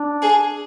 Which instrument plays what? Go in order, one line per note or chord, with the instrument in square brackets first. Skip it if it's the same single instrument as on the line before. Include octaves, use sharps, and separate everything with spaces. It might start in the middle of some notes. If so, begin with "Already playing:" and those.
Already playing: [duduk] D4
[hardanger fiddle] G#4